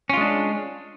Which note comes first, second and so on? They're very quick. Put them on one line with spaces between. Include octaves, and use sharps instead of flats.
C#4 F4 G#3 D4